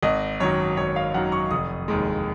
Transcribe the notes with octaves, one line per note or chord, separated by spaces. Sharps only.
G#1 D#5
F#2 D#3 F#3 C#5
G#1 C#5
F5
F#2 D#3 F#3 F#5
C#6
F1 D#6
D#2 D#3 G#3